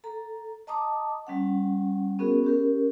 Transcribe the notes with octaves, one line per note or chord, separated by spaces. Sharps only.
A4 A#5
D#5 A5 A#5 D6 D#6
G3 C#4 F#5
B3 C#4 F#4 G#4 A#4
C#4 G4 A#4